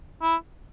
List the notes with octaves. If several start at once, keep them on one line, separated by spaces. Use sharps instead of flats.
E4